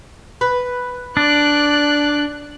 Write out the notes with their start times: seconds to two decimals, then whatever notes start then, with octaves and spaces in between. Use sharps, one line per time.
0.41 B4
1.17 D4 D5 F#6